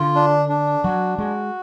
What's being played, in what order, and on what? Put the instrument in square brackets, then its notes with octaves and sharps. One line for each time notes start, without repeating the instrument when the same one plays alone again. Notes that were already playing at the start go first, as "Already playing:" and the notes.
Already playing: [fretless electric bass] D3 [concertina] F4
[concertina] D4
D4
[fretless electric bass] F#3 [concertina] F#4
[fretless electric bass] G#3 [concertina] F#4